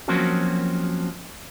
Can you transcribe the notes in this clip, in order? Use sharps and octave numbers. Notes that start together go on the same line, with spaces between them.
F3 F#3 A#3 C4 C#4 F#4